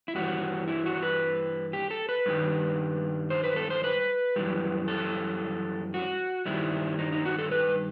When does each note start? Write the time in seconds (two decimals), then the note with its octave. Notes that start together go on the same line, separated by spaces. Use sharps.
0.08 E4
0.15 G2 E3 G3 F#4
0.68 E4
0.86 F#4
1.03 B4
1.73 G4
1.91 A4
2.09 B4
2.26 G2 D#3 G3
3.30 C5
3.44 B4
3.56 A4
3.70 C5
3.84 B4
4.36 F#2 E3 G3
4.88 A4
5.94 F#4
6.46 G2 D#3 G3 E4
6.99 D#4
7.12 D#4
7.25 F#4
7.38 A4
7.51 B4